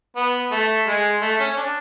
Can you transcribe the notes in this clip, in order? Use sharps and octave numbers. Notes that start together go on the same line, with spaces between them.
B3
A3
G#3
A3
C#4
C#4
D4